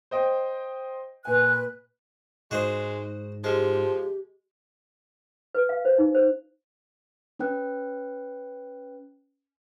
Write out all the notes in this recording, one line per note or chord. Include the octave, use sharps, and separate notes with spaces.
C5 D#5 G5
A#2 B4 G#5 F#6
G#2 G#3 F#4 C5 D#5
F3 G#3 G4
B4
F5
C5
D#4
C5
C#4 B4 G5 F#6